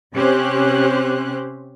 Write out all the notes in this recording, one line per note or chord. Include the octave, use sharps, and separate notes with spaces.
C3 C4 C#4 G4 C5 F#6